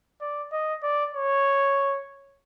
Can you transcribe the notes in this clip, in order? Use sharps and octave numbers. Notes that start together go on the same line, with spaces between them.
D5
D#5
D5
C#5